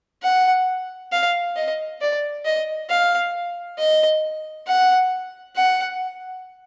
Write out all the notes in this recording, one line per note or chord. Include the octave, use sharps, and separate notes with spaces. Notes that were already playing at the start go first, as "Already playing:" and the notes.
F#5
F5
D#5
D5
D#5
F5
D#5
F#5
F#5